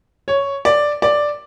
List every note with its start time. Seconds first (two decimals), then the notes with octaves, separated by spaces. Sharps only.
0.28 C#5
0.65 D5
1.02 D5